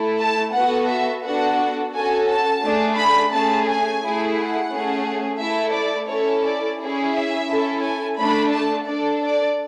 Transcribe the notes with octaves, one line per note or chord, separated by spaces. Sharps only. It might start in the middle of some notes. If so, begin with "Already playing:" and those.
Already playing: A3 E4 A4
A5
B3 F#4 A4 F#5
E5
B3 D4 F#4 A4 F#5
C#4 F#4 A4 G#5
A5
A3 D4 G#4
B5
A3 C#4 G#4 A5
G#5
A3 E4 G#4
F#5
A3 C#4 G#4
A3 E4 A4 E5
D5
C#4 E4 A4 C#5
D5
C#4 E4 G#4
E5
C#4 E4 A4
G#5
A3 D4 A4 B5
A5
D4 A4 D5
D5